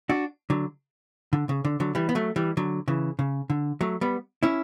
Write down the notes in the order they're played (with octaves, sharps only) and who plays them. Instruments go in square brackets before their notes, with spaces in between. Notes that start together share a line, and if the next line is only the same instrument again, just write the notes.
[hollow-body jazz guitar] D4 F#4
D3 F#3
D3
C#3
D3
D3 F#3
E3 G3
B3
F#3 A3
E3 G3
D3 F#3
C#3 E3
C#3
D3
F#3 A3
G3 B3
C#4 E4